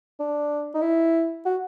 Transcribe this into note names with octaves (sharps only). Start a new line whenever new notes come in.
D4
D#4
E4
F#4